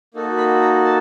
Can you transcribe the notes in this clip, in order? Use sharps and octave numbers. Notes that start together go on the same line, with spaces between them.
A#3 D#4 F#4 A4
B5
A#5
A5